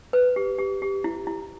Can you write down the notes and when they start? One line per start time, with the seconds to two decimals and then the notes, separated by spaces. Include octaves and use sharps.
0.13 B4
0.36 G4
0.58 G4
0.82 G4
1.04 E4
1.27 E4